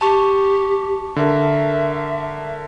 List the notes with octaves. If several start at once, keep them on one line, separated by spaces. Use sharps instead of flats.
G4 A5 C#6
D3 A#4 E5